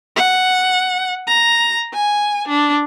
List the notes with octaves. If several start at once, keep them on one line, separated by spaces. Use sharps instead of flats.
F#5
A#5
G#5
D4